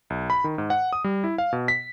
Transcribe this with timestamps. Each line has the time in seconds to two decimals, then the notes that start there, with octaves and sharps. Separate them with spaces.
0.10 B1
0.30 B5
0.44 D#3
0.58 G#2
0.70 F#5
0.93 D#6
1.04 G3
1.24 E4
1.38 F5
1.53 B2
1.68 B6